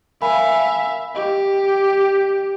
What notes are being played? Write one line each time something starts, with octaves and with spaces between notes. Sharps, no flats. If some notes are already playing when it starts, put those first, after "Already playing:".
A#4 E5 F5 G#5 B5
G4 D#5